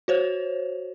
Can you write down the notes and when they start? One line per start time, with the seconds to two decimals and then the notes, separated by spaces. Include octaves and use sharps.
0.08 F#4 C5 C#5